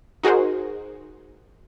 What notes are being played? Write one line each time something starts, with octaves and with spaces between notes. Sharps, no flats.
D#4 F#4 G#4 A#4 C5